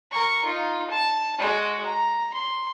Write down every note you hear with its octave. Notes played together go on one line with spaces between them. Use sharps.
A#4 C#6
D#4 F4
A5
G#3 F#4
A#5
C6